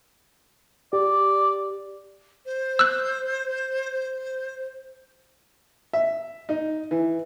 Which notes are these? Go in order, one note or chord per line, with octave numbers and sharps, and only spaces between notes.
G4 D5
C5
E6 F#6
E5
D#4
E3